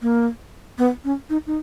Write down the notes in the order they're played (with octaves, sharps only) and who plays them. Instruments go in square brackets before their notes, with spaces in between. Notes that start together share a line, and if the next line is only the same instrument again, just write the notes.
[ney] A#3
B3
C#4
D#4
D#4